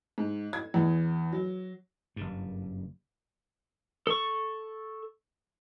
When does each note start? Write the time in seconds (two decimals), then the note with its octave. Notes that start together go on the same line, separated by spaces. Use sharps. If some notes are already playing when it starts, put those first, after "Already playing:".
0.18 G#2
0.53 G#6
0.74 E2
1.33 F#3
2.16 F#1 G2
4.07 A4 C#6